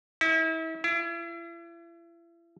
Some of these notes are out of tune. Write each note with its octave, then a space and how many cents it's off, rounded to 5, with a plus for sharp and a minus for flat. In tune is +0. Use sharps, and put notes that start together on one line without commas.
E4 -35
E4 +40